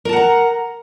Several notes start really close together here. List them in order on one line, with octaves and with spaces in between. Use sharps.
A#4 A5 F#5 A#5